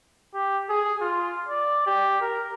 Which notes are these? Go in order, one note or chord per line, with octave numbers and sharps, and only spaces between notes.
G4
G#4
F4
D5
G4
A#4